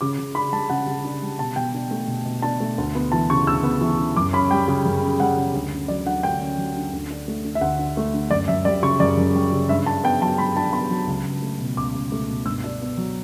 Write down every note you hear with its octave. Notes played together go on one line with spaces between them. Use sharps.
C#3 D6
C#3
D4 B5
G3 A5
C#3 F#5
C#3
D4
G3
B2 A5
B2 G5
D4
A3
B2
B2
D4 A5
A3
D2
B3
E3 A5
C#3 C#6
D2 E6
B3
E3
C#3
F#2 D6
C#4 B5
G3 G5
C#3
F#2
C#4
G3 F#5
C#3
D2
C#4
F#3 D5
D3 F#5
D2 G5
C#4
F#3
D3
D2
D4
A3
D3
E5
D2 F#5
D4
A3
D3
F#2 D5
F#2 E5
G3 D5
C#3 C#6
F#2 D5
F#2
G3
C#3
G2 E5
D4 A5
B3 G5
F#3 A5
G2 B5
D4 A5
B3 B5
F#3
C#2
C#2
A3
B2
C#2 D6
C#2
A3
B2
G2 E6
D4
B3
F#3